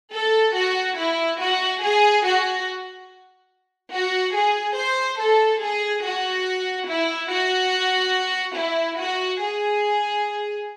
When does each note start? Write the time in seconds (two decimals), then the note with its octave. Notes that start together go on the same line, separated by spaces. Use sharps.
0.13 A4
0.57 F#4
0.98 E4
1.41 F#4
1.83 G#4
2.25 F#4
3.93 F#4
4.36 G#4
4.77 C5
5.20 A4
5.62 G#4
6.03 F#4
6.88 E4
7.30 F#4
8.56 E4
8.99 F#4
9.41 G#4